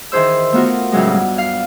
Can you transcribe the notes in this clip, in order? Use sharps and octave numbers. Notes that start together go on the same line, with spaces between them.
D#3 E3 G#4 C5 E6
A3 B3 F4 F#4 A#4
A2 C#3 F#3 G#3
G2
F5